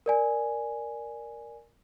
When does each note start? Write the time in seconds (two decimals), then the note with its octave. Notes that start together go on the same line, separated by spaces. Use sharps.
0.06 A#4 D5 G#5